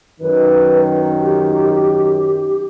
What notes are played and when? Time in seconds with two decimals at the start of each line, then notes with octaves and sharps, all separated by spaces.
0.20 F#2 D#3 B4
1.20 G4